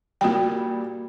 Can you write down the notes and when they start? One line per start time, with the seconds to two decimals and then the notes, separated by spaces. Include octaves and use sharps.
0.21 A#2 G3 F#4 G5